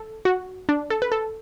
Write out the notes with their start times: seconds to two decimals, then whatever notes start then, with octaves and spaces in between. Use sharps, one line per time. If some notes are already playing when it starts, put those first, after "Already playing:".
Already playing: A4
0.25 F#4
0.69 D4
0.90 A4
1.02 B4
1.12 A4